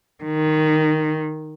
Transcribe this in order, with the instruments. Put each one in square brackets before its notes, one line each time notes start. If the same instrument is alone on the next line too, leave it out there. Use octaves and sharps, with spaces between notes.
[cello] D#3